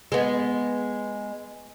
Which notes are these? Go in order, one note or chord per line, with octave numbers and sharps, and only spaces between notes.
G#3 B3